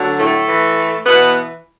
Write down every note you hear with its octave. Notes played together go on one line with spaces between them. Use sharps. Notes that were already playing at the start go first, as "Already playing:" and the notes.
Already playing: D2 D3 F#3
A2 A3
A2 E3
B2 E3 B3